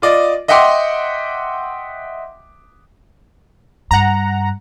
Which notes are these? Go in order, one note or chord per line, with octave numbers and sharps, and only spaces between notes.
F4 D5 D#5
D#5 E5 F#5 G5 C6 D6
G2 F#5 A#5